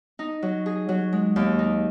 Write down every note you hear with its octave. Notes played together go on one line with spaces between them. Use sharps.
D#4
F#3
G#4
F#3
G#3
D#2
D#4